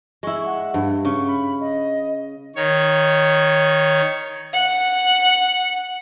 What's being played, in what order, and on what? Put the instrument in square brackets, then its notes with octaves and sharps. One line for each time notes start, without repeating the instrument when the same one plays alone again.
[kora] G#3 E4 [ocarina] C#6
[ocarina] F#5
[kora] G2
[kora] C#3 [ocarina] C#6
[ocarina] B5
D#5
[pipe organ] D#3 C#5
[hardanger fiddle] F#5